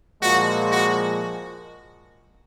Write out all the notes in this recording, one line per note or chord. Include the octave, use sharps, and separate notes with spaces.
A#2 F3 G#3 F#4
F#4